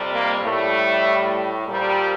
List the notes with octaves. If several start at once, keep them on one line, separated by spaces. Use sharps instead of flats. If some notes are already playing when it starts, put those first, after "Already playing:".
Already playing: F2 C3 G3
A#3
A2 G3 A3
A#2 F3 G3